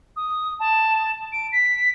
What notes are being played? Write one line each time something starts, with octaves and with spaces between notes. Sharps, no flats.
D#6
A5
D7
B6